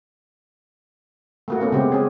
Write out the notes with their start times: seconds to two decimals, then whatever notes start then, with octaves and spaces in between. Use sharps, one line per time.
1.48 A3 A#3 F#4
1.60 A3 B3 C#4
1.72 C#3 G#3 C4 G4
1.92 C#4 G#4